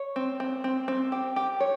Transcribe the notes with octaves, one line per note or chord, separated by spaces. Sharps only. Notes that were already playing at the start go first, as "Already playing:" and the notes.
Already playing: C#5
C4
C4
C4
C4
G4
G4
C#5